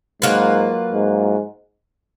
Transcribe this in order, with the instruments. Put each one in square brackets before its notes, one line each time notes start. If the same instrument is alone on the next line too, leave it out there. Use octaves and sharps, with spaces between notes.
[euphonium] G#2 [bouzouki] F#3 A#3 F4 B4
[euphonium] G#2